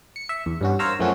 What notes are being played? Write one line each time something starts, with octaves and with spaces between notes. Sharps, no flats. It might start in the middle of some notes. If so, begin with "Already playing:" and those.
C#7
E5
E2
G2 C#4 F#4
A#4 C5 C#5 F5 A#5 E6
F#2 F3 A3 A#3 C#4 F#4